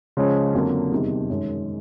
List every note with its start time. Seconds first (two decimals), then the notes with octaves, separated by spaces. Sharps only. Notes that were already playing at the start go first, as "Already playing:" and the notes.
0.17 C#3 F3 G#3 C#4
0.54 F2 D3 F#3 A#3
0.92 E2 C3 D#3 G3
1.30 F#2 D#3 G#3